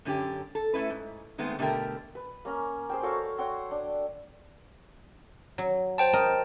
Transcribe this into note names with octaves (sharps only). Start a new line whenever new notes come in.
F#2 D3 C#4 F#4 G4
A4
A3 C#4 D#4 E4 B4
G#2
D#3 G#3 A3 B3 C4
B2 D3 A3 G4 A#4 G5
B4
A#3 C#4 A#5
G#4 C5 G5
F#4 A4 C#5 F5
C#5 F#5 G5 C6
D4
F#3
C5 G5 A5
A#4 D#5